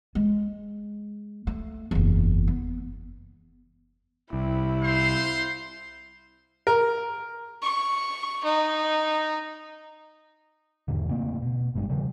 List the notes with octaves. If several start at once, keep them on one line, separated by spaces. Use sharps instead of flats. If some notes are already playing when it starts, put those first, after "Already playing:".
G#3
A3
F#1 E2
B3
C2 E4
C5 F5 C6
A#4
C#6
D#4
E2 G#2 D3
C#3 A3 A#3 C4
B2
G1 G2 G#3
C#3 E3 F3 G3